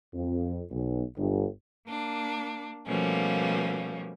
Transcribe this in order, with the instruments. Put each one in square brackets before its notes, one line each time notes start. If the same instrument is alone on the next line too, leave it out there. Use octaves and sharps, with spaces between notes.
[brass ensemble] F2
B1
G1
[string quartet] A#3 D4
B2 F3 G3 A3 A#3 C#4